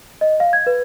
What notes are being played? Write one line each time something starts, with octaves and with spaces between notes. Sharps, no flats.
D#5
F5
G#6
B4